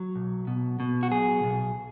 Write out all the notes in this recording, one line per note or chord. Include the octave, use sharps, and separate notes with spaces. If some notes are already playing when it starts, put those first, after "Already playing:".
Already playing: F#3
B1
B2
B2
F#4
B1 G#4
B1